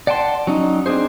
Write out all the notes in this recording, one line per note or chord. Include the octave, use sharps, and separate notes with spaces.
D5 F#5 G5 A5 C6
F#3 C#4 D#4
C4 D4 G#4 C5